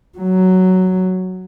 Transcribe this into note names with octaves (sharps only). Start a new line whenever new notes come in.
F#3